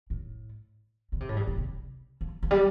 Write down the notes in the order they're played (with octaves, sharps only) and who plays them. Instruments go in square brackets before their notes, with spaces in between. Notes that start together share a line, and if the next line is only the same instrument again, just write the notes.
[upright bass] A2
D3
C3
A2
G2
A2
C3
F3
F3
G3